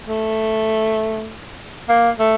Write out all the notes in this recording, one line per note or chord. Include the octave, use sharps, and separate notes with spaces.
A3
A#3
A3